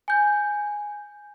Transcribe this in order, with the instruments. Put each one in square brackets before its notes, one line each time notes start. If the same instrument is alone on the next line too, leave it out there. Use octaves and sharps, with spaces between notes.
[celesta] G#5 G6